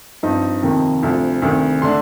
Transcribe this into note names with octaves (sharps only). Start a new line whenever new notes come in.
G2 F3 C4 D#4
F2 C3 D#3 A#3
D2 C3 F3
D2 C3 D#3
D3 A3 D4 C6